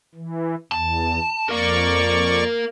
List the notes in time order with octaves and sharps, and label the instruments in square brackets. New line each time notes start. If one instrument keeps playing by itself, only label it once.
[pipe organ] E3
[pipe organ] E2 [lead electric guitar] A5
[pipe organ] F2 D5 C#6 [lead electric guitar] A#4 F5